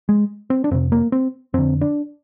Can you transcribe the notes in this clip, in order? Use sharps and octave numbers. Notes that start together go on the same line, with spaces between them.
G#3
C4
D4
F2 C3 C4
A#3
C4
F2 D3 C4
D4